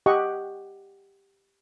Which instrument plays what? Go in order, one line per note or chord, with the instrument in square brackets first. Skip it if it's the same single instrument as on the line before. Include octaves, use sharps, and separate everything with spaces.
[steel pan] G4 D#5 F#5 C#6